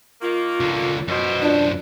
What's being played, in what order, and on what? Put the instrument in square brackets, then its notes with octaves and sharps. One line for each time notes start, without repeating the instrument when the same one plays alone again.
[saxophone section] D#3 A#3 [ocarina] F4
[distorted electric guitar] C#2 D3
[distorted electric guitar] F#2 C5 [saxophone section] B2
[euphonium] D4 [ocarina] F4